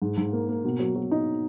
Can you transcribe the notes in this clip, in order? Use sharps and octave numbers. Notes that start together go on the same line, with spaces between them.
G#2
G#2
A#3
A#3
B2
F#3
F#3
D#4